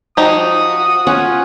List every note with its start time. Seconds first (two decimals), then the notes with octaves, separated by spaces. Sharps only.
0.17 F3 D#4 F#4 G4 D#6
1.07 C#4 F4 F#5